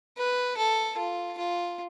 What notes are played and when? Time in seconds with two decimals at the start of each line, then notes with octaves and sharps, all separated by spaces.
0.17 B4
0.57 A4
0.97 F4
1.38 F4